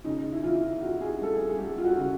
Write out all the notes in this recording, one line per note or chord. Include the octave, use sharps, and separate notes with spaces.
C#3 D#4
E4
E3 F4
F2 F#4
G#4
G4
G3 A4
G#4
G#4
G3 G4
F4
F#4
C#3